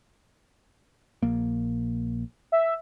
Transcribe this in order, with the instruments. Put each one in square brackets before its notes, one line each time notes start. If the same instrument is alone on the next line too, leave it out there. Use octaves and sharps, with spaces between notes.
[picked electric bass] A#1 A#3
[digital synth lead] E5